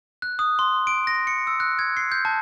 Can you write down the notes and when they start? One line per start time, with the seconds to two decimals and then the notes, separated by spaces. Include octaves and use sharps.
0.22 F#6
0.39 D#6
0.59 C6
0.87 D7
1.07 A#6
1.27 C#7
1.47 E6
1.60 F#6
1.79 G#6
1.97 C7
2.12 G6
2.25 A5